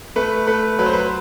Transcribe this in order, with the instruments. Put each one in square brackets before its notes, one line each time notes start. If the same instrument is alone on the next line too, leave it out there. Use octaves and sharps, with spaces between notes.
[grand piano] A3 B4
A3 B4
F#3 B4
C5
B4